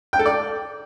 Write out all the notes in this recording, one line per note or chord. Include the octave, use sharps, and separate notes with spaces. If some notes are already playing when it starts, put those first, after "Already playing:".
G5
A4
D5